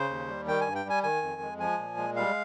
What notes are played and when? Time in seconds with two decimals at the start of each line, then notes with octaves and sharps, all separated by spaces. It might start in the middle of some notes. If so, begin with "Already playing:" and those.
Already playing: C#3 C5
0.09 D#2
0.28 G3
0.47 D#3 G5
0.61 G#5
0.67 G2
0.75 G5
0.85 G3 G#5
1.03 D#3 G#5
1.22 F2
1.41 G#3
1.60 F3 G#5
1.78 A#2
1.97 G#3
2.16 G3 F5